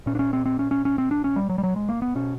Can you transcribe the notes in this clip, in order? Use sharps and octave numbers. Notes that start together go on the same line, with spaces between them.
A#2 C#4
D4
C#4
C4
C4
C#4
C#4
C#4
C4
D4
C#4
G3
F#3
G3
F#3
G#3
A#3
B3
B2 C#4